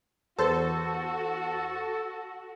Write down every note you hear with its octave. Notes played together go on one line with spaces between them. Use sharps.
E2 F#4 A4 C5 A5